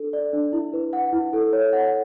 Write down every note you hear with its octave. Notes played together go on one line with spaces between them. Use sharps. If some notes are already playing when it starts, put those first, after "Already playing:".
Already playing: D4 A4
D5
D4
E4
B4
F#5
E4
A4
C#5
F#5